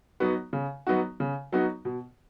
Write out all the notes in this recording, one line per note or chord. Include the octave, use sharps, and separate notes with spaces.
F#3 B3 D#4 F#4
C#3
F#3 B3 D#4 F#4
C#3
F#3 B3 D#4 F#4
B2